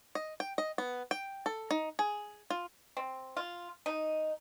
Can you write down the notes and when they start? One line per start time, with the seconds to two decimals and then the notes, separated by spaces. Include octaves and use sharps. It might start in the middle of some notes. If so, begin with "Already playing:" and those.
0.15 D#5
0.40 G5
0.58 D#5
0.78 B3
1.11 G5
1.46 A4
1.71 D#4
1.99 G#4
2.50 F4
2.97 C4
3.37 F4
3.86 D#4